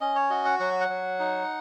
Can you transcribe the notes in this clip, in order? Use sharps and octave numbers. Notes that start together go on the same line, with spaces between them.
C#4 D#5
C#5
F#4 D#5
F#5
F#3 F#5
F#5
F#3
D#4